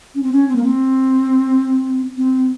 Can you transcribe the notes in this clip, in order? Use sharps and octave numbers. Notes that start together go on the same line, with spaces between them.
C#4
C4
C#4
C4
A#3
C4
C4